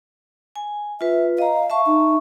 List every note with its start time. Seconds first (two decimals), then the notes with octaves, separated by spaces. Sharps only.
0.56 G#5
1.01 F4 B4 E5
1.38 D#5 F5 A#5
1.70 E5 A5 C#6
1.86 D#4